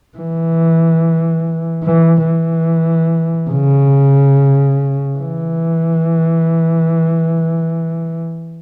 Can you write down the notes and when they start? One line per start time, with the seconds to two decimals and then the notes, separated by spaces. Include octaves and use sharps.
0.18 E3
1.84 E3
2.26 E3
3.50 C#3
5.17 E3